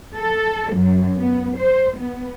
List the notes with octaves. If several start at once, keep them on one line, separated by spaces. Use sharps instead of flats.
A4
F#2
B3
C5
B3